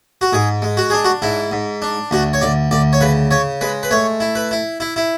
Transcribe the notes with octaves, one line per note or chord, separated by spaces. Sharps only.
F#4
G#2 G#4
G#3
F#4
D4 G#4
F#4
G#2 E4
G#2
D4
D2 F#4
C#5
D2 D5
D2 D5
C#5
C#3 B4
C#3 C#5
G#3 B4
B4
A3 C#5
E4
B4
E4
E4
E4